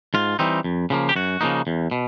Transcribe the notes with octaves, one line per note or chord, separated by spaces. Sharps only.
G#2 F4
E3 G3 C4 D#4
F2
C#3 F3 A#3
G4
F#2 F#4
C#3 F3 A#3 D#4
E2
B2